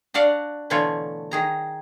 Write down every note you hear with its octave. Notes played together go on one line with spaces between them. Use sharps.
D4 F#4 D5 F5 F#5
B2 D3 E3 A3 F4 C#5
D#3 G#4 A#5